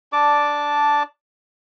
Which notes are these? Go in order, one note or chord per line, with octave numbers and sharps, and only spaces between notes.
D4 D5 A5 D6